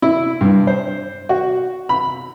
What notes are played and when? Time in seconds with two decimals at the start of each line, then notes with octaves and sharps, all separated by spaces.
0.02 E4
0.41 G2
0.67 C5
1.29 F#4
1.89 B5